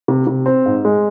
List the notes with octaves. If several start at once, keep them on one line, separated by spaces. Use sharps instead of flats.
C3
C3
C4
G#2
G#3